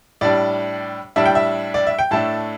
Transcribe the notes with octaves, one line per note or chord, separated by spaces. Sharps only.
A2 G3 D4 D5
A2 G3 D4 E5
G5
E5
D5
E5
G5
A2 A3 D4 A5